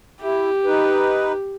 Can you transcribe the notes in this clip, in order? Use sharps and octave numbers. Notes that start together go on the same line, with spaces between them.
E4 G4
D#4 B4